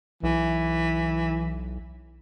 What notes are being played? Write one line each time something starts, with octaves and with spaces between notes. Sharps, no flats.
B1 E3